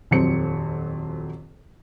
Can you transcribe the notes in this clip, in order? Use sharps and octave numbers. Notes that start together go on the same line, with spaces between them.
D#1 F2 F#3 C4 C#7